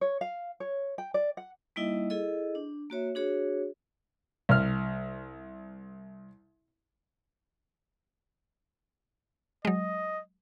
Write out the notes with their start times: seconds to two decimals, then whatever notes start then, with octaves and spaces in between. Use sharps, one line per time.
0.01 C#5
0.21 F5
0.60 C#5
0.98 G5
1.14 D5
1.37 F#5
1.76 G3 A#3 D#4 E4 D#5 E5
2.10 E4 G#4 A4 D#5
2.55 D4
2.90 A#3 F#4 C#5 E5
3.15 D4 F#4 G#4 C#5
4.49 C2 F6
9.65 F#3 G#3 D#5